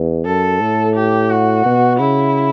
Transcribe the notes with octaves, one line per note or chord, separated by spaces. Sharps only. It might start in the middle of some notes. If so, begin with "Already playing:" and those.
Already playing: E2
F#2 A4
A2
G4
F#4
B2
C#3 E4